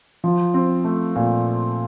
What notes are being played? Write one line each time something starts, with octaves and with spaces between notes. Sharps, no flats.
F3
C4
A3
A#2